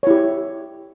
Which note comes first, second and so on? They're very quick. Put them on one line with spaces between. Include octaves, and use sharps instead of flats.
C#5 E4 G4